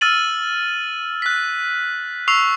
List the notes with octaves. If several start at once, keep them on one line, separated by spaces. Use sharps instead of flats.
E6 F6 A6 D#7 F#7
F#6 B6
C#6 E6 C7 F7